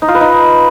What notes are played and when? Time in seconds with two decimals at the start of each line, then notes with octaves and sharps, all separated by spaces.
0.02 D#4
0.08 F4
0.15 B4
0.21 D#4